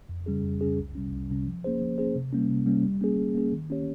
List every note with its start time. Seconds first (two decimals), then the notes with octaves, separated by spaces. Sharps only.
0.09 F2
0.26 C#3 G3 C#4 G#4
0.44 F2
0.61 C#3 G3 C#4 G#4
0.78 C2
0.95 C3 G3 C#4
1.12 C2
1.30 C3 G3 C#4
1.46 F3
1.64 A#3 C#4 G#4 C5
1.81 F3
1.98 A#3 C#4 G#4 C5
2.16 C3
2.33 G3 A#3 C#4
2.50 C3
2.66 G3 A#3 C#4
2.84 G3
3.01 A#3 C#4 G#4
3.18 G3
3.35 A#3 C#4 G#4
3.52 D#3
3.70 A#3 C#4 G4 C#5